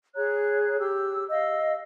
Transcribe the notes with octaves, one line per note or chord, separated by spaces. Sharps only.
G#4 C#5 A#5 F#6
G4 E6
D#5 F5 E6